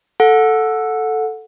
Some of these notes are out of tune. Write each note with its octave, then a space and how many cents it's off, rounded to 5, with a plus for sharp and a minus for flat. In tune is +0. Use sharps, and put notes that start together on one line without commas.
A4 +0 F#5 -20